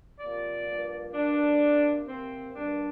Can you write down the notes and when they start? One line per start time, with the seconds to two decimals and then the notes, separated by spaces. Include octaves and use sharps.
0.18 C3 F3 A#3 D5
0.66 G2 F3 A#3
1.13 G2 G3 A#3 D4
1.60 C3 A#3
2.08 C3 A#3 C4
2.55 G2 G3 A#3 D4